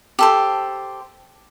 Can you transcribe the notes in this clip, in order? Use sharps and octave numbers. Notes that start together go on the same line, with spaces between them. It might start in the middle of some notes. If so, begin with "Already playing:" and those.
G4 A4 C5